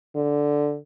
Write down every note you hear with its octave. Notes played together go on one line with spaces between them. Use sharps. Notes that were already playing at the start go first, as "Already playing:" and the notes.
D3